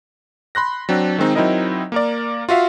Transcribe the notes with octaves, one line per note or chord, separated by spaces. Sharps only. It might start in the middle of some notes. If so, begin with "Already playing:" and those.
B5 C6 F#6 A#6
F#3 C4 D4
D#3 G#3 C4 D#4
F#3 C4 D#4 E4 A#4 D#5
A#3 A#4 D5
F4 F#4 E5 F5